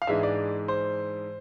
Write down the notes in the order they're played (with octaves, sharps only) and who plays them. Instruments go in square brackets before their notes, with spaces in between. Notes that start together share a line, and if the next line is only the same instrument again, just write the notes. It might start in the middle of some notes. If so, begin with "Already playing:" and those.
[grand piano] F5
G#2 E3 G#3 D4 E5
D5
C5